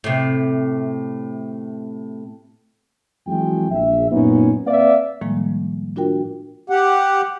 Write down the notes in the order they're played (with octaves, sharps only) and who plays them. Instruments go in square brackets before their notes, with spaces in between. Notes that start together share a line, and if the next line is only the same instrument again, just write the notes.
[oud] A2 C3
[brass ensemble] F2 E3 F#3 G#3 F#4 G5
A#1 E5
F#2 A#2 A#3 B3 C#4 D#4
A#3 C4 B4 D5 E5 F5
[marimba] A2 D#3 F3 G3 G#3 A#3
D4 F4 F#4 A#4 G5
[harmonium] G4 F#5